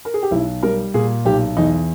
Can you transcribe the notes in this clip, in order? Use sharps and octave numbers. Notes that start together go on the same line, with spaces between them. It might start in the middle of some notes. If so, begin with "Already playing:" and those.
A#4
G#4
G4
B1 E4
G3 A#4
A#2 G#4
B1 G4
E2 D#4